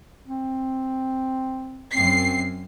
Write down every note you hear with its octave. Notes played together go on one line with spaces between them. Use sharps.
C4
F#2 C4 C7